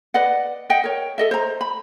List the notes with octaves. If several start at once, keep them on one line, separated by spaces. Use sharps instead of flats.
B4 D5 D#5 F#5
D#5 E5 F#5 G5
A#4 C#5
A4 D#5 E5
C5 A#5
B5